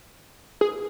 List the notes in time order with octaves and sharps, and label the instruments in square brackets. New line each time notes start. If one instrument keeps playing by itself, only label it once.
[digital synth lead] G#4